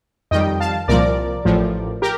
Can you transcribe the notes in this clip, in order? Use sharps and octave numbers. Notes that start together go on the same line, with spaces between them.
F2 D#3 G3 D#5 G5
F5 A5
C2 A#2 F3 A#4 D5
A1 A2 F3
G4 A#4